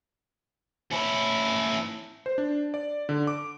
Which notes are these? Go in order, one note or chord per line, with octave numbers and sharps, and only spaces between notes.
C#4 E4
C5
D4
D5
D3
D6